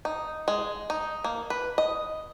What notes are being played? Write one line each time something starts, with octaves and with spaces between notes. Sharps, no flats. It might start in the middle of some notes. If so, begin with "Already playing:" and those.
D#4
G#3
D#4
A#3
B4
D#5